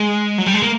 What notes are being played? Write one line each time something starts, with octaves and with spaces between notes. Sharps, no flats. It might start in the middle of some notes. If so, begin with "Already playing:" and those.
Already playing: G#3
F#3
G3
G#3
A#3